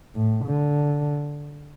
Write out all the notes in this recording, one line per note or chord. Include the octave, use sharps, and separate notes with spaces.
A2
D3